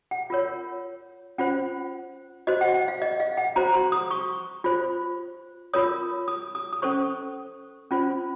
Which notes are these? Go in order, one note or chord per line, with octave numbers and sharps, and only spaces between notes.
F#5
F4 A#4 C#5
C#4 F4 C5 F#5
F#4 C5 D#5
F#5
F#5
F5
D#5
F5
F#5
F#4 C5 A#5
C6
D#6
C#6
F4 C5
F4 A#4 C#5 D#6
D#6
D#6
D#6
C#4 A4 C5 C#6
C#4 F4 C5